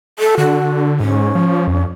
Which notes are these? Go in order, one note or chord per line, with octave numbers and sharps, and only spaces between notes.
A4
D3 F#4
G#2 C#4
F3
F2